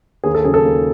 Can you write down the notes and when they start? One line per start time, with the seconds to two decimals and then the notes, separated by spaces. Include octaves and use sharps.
0.24 D#2 G#4
0.35 A4
0.44 C#3 F#3 G#4
0.54 A4
0.64 D#2